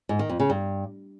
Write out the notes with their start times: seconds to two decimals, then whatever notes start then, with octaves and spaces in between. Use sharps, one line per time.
0.09 G#2
0.19 D#3
0.29 F2
0.40 C#3
0.50 G2